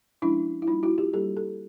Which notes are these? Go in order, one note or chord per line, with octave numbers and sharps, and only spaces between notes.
F3 G#3 C#4 D4 E4
E4
G3 A#3 D4 D#4 F4
E4 F#4
F4 G4
G3 A#3 D4 G4 A4
G4 A4